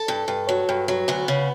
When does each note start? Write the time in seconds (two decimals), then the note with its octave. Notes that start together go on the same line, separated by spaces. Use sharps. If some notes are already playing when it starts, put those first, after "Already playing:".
Already playing: A4
0.08 G2
0.28 G2
0.49 F#3
0.69 G2
0.88 F#3
1.08 D2 B3
1.28 C#3